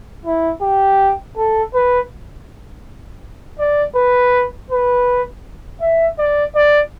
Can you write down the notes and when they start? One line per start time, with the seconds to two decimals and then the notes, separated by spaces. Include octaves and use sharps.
0.26 E4
0.62 G4
1.37 A4
1.74 B4
3.59 D5
3.95 B4
4.70 B4
5.81 E5
6.19 D5
6.56 D5